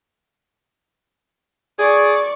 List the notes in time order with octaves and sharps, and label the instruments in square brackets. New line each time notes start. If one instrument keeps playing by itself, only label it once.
[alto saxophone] G#4 [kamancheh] D5 C#6